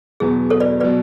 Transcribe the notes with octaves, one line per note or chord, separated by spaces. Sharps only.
E2 B2 F#3 B3 G#4
A4 C#5
B4 D5
B2 F#3 B4 D5